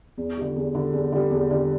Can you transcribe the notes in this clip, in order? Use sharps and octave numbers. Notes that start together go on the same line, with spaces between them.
E2
D3 G3
E2
D3 G3
E2
D3 G3
E2
D3 G3